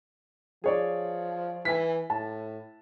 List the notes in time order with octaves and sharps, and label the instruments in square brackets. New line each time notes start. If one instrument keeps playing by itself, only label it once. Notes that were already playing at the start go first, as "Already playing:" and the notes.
[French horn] F3 [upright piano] G#4 C#5 D5
[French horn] E3 [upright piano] G#5 B6
[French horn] A2 [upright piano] A5